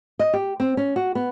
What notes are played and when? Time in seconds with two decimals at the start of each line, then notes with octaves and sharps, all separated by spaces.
0.19 D#5
0.33 G4
0.60 C4
0.77 C#4
0.96 F#4
1.15 B3